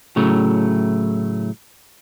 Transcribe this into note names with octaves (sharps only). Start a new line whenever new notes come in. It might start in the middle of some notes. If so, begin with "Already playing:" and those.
A2 C#3 F#3 A3